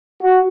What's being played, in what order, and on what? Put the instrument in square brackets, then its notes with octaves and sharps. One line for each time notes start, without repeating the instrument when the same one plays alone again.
[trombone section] F#4